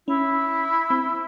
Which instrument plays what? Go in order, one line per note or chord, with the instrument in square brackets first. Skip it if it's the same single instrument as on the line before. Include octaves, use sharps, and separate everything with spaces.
[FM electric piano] C#4 [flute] E4
[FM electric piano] C4